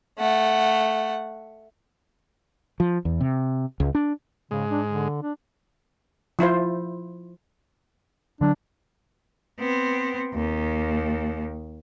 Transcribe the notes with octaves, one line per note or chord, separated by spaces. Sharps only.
A3 F#5
F3
E2
C3
C#2
D4
G#2 C#3 G#3
D4
D3
D4
F3 E4 F4 C5
D3 F#3 D4
B3 C4
D#2